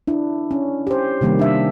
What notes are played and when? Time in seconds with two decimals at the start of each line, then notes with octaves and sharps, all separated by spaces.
0.07 D4 E4
0.51 C#4
0.87 G4 C5
1.21 C3 D#3 G3 A#3
1.39 D4 E5